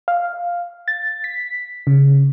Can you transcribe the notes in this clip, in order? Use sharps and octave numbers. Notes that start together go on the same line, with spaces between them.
F5
A6
B6
C#3